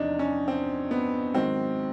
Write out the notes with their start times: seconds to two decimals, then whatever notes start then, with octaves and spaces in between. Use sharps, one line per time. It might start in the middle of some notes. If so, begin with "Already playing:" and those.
Already playing: E2 C3 F3 D4 D#4
0.19 C#4
0.48 C4
0.91 B3
1.34 G#2 D#3 F#3 C4